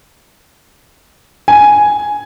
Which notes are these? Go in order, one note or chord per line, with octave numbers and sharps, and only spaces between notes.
G#5